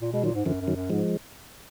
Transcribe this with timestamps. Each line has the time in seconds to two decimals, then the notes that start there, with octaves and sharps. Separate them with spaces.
0.02 A#2
0.13 B2 G#3
0.23 A#2 D#3 F#3
0.35 G#2
0.45 F#2 D3 F3
0.61 F#2
0.68 D#3 F#3
0.75 F#2
0.90 G#2 F3 G#3